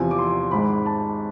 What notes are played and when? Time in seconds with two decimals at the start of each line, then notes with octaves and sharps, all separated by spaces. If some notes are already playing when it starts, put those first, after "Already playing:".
Already playing: E2 C3 F3 G#5
0.11 D6
0.19 C6
0.51 G#1 G#2 G#3 B5
0.86 A5